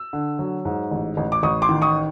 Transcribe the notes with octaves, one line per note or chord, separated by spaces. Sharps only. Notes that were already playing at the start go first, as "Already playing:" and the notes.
Already playing: E6
D3
F#3
G#2
A1
A1
D6
A1 C#6 D#6
C6 D6
D#3
C#6 D#6